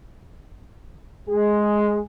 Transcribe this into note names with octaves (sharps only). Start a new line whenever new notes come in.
G#3 G#4